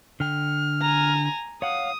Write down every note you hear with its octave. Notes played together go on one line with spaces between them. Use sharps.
D3 G5 F6
G#5 A#5
C#5 F5 F#5 D#6